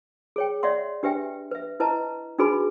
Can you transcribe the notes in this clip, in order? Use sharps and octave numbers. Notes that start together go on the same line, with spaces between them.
G#4 C#5 G5
C#5 D5 E5 F#5 C6
D4 G4 B4 E5 G5
B4 E5
E4 B4 D#5 A5 A#5
D4 D#4 F#4 G#4 B4 B5